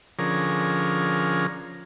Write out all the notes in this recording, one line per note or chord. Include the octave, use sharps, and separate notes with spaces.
D3 F3 C#4 G#4 A#4